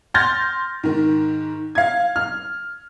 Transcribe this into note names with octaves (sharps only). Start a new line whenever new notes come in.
C6 F6 G6 A6 A#6
G#2 D#3
F5 G#6
F6